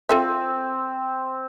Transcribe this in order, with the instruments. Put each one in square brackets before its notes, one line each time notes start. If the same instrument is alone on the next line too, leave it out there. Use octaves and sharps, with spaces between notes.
[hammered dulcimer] C4 [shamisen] F4 A4 E5